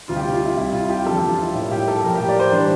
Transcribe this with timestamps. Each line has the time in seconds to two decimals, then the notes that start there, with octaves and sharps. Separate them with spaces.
0.08 D2 C3 G3 F4
0.16 G4
0.21 F4
0.32 F4
0.45 E4
0.57 C2 C3 G3 E4
0.73 F4
0.89 G4
1.05 E2 D3 F3 A3 A4
1.18 G4
1.31 F4
1.42 E4
1.54 A2 G3 A#3 E4
1.71 G4
1.88 A4
2.04 A2 F3 A#3 A#4
2.15 G4
2.29 D5
2.40 C5
2.52 E3 G3 D4